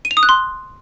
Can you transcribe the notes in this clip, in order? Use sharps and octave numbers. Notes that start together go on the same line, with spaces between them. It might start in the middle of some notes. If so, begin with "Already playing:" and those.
D#7
F7
D#6
F#6
C6